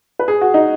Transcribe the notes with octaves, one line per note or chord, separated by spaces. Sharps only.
B4
G#4
F#4
D#4